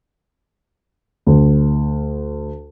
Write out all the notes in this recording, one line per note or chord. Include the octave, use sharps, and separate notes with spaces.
D2